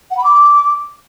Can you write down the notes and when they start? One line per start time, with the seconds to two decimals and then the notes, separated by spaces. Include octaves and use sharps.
0.10 F#5
0.17 B5
0.23 D6